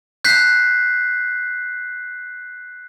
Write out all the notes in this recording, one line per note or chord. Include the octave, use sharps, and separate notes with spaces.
F#6 G6 B6 C7